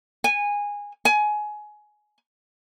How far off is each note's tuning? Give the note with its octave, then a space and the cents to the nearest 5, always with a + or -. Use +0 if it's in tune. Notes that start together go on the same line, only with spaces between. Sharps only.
G#5 -15
G#5 +20